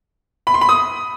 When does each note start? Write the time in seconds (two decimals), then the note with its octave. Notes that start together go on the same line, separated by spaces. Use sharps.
0.47 B5
0.54 C6
0.61 B5
0.69 D#6